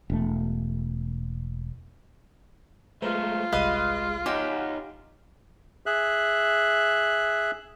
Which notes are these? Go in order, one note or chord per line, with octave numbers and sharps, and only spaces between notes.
E1 A3
G#3 A3 F4 B4 C5 A#5
G1 C2 G3 G#3 B4 D#5 F5
D#4 G4 C#5 D#5 F5 F#5 G#5
G#4 E5 F#6